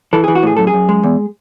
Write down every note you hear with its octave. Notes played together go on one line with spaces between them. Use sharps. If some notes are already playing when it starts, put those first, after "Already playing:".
E3 A4
G#4
E3
F#4
A2 G#4
F#2 A4
G#4
F#2
G#3
E2